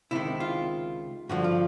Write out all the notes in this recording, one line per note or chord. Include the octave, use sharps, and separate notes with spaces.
C#2 C3 D#3 E4
F4
G2 D3 F3 F#4
F4